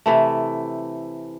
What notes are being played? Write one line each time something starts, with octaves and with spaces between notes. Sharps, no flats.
C3 E3 A3